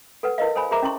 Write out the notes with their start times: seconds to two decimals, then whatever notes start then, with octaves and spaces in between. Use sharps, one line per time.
0.23 A4 B4 F#5
0.38 E4 A#4 B4 D#5 F5
0.56 A4 C5 C#5 G#5 B5
0.71 G#4 A#4 C5 E5 A#5 D6
0.82 C#4 E4 C6 C#6